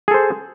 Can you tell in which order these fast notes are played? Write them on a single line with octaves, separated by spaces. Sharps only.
G#4 A4 C5